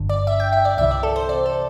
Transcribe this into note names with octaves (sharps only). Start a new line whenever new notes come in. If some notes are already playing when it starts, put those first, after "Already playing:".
Already playing: G1 G2 D3
D5
E5
G5
E5
D5
C2 C3 E3 E5
D5
A4
C5
D5
A4